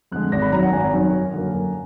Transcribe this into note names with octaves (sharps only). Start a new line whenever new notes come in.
F2 D3 G#3 F#6
G#1 A#6
B5
F#2 D#3 F#3 A#5
F#5
G#1 G#5
F#2 D#3 F#3
F#2
D3 F#3 A#3
F#2